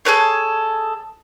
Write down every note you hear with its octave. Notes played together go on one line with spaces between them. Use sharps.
G#4 A4 B4 C#5